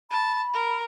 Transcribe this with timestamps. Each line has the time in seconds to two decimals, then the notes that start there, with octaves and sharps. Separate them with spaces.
0.11 A5 B5
0.54 A#4